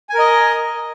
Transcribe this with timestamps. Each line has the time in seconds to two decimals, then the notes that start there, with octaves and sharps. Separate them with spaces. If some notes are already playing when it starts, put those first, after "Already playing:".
0.10 G#5
0.14 A#4
0.19 D#5